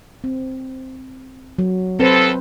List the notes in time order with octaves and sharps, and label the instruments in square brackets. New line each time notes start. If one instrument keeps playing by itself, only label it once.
[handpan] C4
F#3
[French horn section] D#2 A4 [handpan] C4 B4 C5